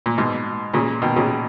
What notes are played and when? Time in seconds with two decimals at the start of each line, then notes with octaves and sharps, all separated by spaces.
0.06 A#2
0.17 G#2 B2
0.74 A#2 C#3
1.02 B2 D#3
1.16 A#2 C#3